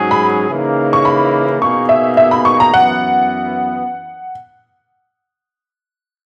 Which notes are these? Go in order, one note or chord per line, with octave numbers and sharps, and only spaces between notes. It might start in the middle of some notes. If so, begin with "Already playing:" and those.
Already playing: G#2 F#3 C#4 G#4
B5
C#3 E3 A#3 D#4
C#6
B5
B2 A#3 D#4 G#4 C#6
E5
E5
B5
C#6
A#5
F#2 E3 B3 F#5